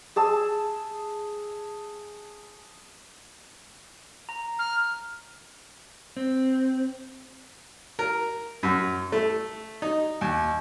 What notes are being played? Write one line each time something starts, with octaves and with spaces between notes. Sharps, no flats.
G#4 A5 E6
A#5
F6
C4
A#4
F#2
A3
D#4
D#2